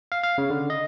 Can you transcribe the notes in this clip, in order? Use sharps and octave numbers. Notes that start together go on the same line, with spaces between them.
F5
F5
C#3
D3
D#5